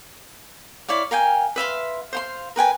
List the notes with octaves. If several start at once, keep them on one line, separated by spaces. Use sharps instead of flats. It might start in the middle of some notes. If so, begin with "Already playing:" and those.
E4 C#5 D5 F5
A#4 F5 G5 G#5
B4 E5 F5 C6
C5 F5 C6
A#4 B4 G5 G#5